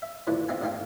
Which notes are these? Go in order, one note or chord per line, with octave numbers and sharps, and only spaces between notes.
E5
F#2 A2 D3 E3 F3
C4 D#4 F4 E5 G#5
A1 G#2 A3 F5 G5